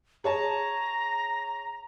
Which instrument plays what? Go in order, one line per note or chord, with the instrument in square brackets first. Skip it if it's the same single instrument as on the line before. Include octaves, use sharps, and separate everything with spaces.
[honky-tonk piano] G#4 C#5 A5 [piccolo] A#5